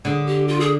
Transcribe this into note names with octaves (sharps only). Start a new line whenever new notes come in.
D3 G#4
G4
F4
G#4